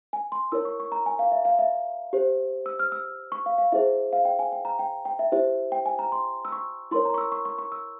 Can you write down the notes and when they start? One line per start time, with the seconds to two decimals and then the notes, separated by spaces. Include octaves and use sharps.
0.13 G#5
0.32 C6
0.52 E4 A#4 C#5 E6
0.65 C#6
0.80 C#6
0.92 A#5
1.06 G#5
1.19 F5
1.32 E5
1.45 F5
1.59 E5
2.13 G4 C5
2.66 E6
2.79 F6
2.92 E6
3.32 C#6
3.46 F5
3.58 F5
3.72 E4 G#4 C5 E5
4.13 F5
4.25 G5
4.39 G#5
4.52 G5
4.65 A#5
4.79 G5
5.05 G5
5.19 E5
5.32 E4 G4 C5 E5
5.72 G5
5.86 G#5
5.99 A#5
6.12 C6
6.45 E6
6.52 C#6
6.91 E4 A#4 C#5 C6
7.05 A#5
7.14 C#6
7.18 E6
7.32 C#6
7.45 C#6
7.58 C#6
7.72 E6